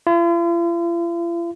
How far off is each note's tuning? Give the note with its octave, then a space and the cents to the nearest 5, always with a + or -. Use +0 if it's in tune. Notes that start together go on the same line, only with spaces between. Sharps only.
F4 -45